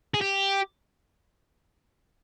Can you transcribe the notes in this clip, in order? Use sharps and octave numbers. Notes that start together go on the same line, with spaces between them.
G#4
G4